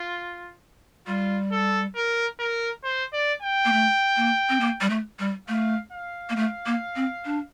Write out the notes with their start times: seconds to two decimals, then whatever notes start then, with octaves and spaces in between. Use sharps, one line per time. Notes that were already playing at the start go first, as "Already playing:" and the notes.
Already playing: F4
1.07 G3 F4
1.52 A4
1.96 A#4
2.39 A#4
2.84 C5
3.13 D5
3.42 G5
3.65 A#3
3.72 A3
4.17 A#3
4.49 C4
4.60 A#3
4.81 G3
4.90 A3
5.19 G3
5.48 A3 F5
5.92 F5
6.30 A#3
6.36 A3
6.66 A#3
6.96 C4
7.25 D4